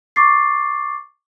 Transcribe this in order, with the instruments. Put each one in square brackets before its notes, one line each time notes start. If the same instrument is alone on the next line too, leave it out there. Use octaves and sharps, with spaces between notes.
[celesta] C#6 D6 A6 C7